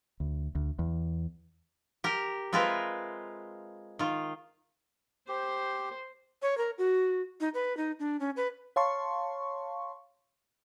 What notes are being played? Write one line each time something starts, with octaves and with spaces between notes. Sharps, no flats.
D2
D2
E2
G4 A#4
G#3 C4 F4 A#4 B4 E5
D#3 F4
G4 C5
C#5
A#4
F#4
D#4
B4
D#4
D4
C#4
B4
C#5 F5 A5 C6 C#6